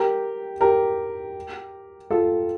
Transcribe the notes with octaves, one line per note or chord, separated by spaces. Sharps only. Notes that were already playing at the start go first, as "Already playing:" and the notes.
Already playing: G4 A#4
G4 A#4
F4 A4